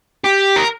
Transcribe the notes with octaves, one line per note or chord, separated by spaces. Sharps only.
G4
A#4